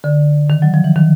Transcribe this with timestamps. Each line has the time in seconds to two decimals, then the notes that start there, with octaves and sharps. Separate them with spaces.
0.04 D3
0.50 D#3
0.62 F#3
0.74 F3
0.84 E3
0.96 D#3